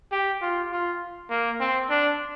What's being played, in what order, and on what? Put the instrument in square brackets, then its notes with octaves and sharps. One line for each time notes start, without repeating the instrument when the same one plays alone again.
[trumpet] G4
F4
F4
A#3
C4
D4